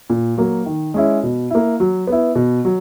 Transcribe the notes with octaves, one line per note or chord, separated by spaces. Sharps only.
A#2
F#3 A#3
D#3
G#3 C#4 E4
B2
A#3 E4
F#3
B3 E4
B2
F#3